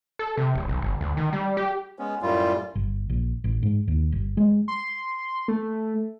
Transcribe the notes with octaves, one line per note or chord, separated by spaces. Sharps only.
A4
C3
E1
B1
G1
D2
D#3
G3
G4
G#3 B3 C#4
F#2 A2 G3 F4
G1
A#1
A1
G#2
D#2
G1
G#3
C6
A3